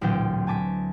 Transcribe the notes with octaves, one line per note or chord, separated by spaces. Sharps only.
A1 D2 A#2 F#3 C4 G5
G#5 A5 D6 B6